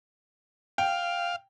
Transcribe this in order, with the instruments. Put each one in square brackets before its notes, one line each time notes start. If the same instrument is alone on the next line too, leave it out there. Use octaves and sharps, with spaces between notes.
[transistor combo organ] F5 [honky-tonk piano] G5